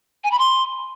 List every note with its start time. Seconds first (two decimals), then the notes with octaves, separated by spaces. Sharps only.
0.24 G#5
0.31 B5
0.39 C6